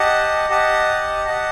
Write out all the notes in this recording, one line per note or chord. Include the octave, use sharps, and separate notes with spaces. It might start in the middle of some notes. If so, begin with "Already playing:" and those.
Already playing: G4 D#5 F#5 A5
G4 D#5 F#5 A5
G4 D#5 F#5 A5